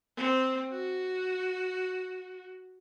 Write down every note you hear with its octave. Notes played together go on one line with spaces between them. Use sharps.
C4
F#4